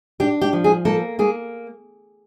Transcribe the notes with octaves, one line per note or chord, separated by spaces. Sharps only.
D4 G4
G4
F3
G#4
A#3 A4
A#3 G#4